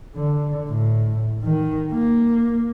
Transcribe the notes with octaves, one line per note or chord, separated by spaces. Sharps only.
D3
A2
D#3
A#3